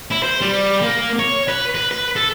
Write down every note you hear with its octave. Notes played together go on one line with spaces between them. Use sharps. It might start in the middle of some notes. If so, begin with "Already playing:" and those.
E4
C5
G3
A#3
C#5
B4
B4
B4
A4